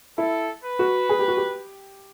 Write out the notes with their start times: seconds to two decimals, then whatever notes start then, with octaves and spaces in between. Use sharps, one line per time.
0.18 E4 A4
0.64 B4
0.79 F#4
1.09 G#4
1.19 G4
1.28 F#4
1.37 G4